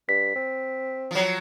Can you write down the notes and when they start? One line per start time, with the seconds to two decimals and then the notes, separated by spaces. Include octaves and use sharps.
0.09 G2 B6
0.36 C4
1.11 F3 F#3